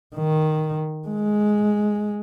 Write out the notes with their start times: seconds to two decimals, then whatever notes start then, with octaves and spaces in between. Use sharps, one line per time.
0.15 D#3
1.08 G#3